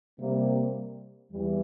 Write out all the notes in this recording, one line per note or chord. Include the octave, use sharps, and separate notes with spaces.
C3 G3 A#3
E2 E3 G3